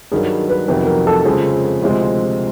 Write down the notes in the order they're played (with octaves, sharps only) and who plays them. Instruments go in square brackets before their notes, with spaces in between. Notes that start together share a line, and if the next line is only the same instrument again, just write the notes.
[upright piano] G2 D#3 F#3 [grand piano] G#4
[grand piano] B4
[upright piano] F2 C3 D#3 F#3 B3 [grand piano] B4
[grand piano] A#4
A4
[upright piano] F2 C#3 F3 G#3 C4 [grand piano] G#4
[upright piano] D2 C3 F3 G#3 C4